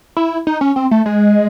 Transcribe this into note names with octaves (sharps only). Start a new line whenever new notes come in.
E4
D#4
C#4
C4
A3
G#3